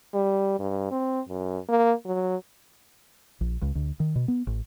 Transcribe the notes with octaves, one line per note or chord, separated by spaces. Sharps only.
G3
G2
C4
F#2
A#3
F#3
A#1
C#2
D2
D#3
B2
B3
A1